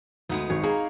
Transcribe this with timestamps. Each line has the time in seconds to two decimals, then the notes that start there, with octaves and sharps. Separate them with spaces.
0.29 D2 G#3 B3 D#4
0.50 G#1 C#5
0.64 A#3 G#4 A#5